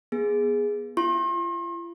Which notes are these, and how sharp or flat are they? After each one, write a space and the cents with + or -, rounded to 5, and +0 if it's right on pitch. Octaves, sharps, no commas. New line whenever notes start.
B3 -20 G#4 +0
F4 -45 C6 +40